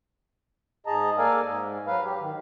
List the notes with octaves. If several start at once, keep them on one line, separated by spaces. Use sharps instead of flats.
G#2 G#4 D#5 A5 A#5
A#3 A4 A#4 D5 F5 G#5
G#2
F#3 B4 F5
G4
D#3